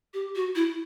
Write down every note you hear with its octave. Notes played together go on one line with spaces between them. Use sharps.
G4
F#4
E4